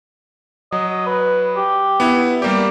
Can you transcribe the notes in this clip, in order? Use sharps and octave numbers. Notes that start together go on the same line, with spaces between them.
F#3 D#5
B4
G4
B3 E4
G3 A#3 G4 D5